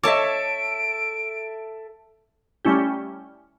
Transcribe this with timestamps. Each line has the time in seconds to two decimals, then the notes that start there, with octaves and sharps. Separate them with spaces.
0.04 A4 C#5 D#5 E5 A5 D6 D7
2.65 G3 A3 C#4 E4 G4